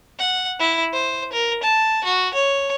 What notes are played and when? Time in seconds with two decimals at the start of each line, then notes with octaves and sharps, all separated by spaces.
0.19 F#5
0.60 E4
0.93 C5
1.33 A#4
1.63 A5
2.04 F#4
2.34 C#5